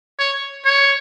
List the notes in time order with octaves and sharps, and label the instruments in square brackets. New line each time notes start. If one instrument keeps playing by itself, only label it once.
[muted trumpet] C#5
C#5